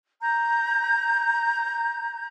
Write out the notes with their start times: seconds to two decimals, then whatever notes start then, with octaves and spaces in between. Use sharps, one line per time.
0.22 A#5 G6